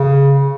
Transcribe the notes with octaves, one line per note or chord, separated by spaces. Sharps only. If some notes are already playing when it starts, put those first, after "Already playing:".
Already playing: C#3